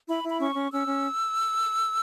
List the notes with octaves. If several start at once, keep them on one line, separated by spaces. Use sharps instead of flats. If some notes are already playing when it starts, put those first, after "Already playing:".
E4 B5
E4 B5
C#4 C#6
C#4
C#4 E6
C#4